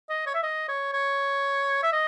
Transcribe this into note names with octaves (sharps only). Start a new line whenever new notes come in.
D#5
C#5
E5
D#5
C#5
C#5
E5
D#5